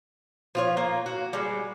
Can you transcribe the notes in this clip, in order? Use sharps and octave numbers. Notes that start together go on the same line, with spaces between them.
F3 F4 C#5
A#3
F#4
G3 G#3